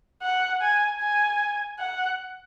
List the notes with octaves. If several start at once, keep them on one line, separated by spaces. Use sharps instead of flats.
F#5
G#5
G#5
F#5